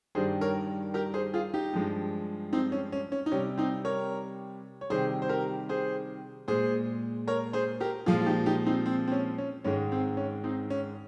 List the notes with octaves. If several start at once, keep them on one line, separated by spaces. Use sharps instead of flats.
G2 D#3 G3 G#4 C5
A#4 C#5
G4 A#4
G#4 C5
F4 G#4
D#4 G4
G2 F3 G#3
C4 D#4
C#4
C#4
C#4
D#4
C3 G3 C#4
C4 D#4
A#4 C#5
C#5
C3 D#3 G3 G#4 C5
C5
G4 A#4
G#4 C5
A#2 G#3 G#4 C5
A#4 C#5
G#4 C5
G4 A#4
A#2 F3 G#3 F4 G#4
F4
D#4 G4
D#4 G4
C4 D#4
C4
C4
C#4
C#4
G#2 D#3 G#3 C#4
C4
C#4
C4 D#4
C#4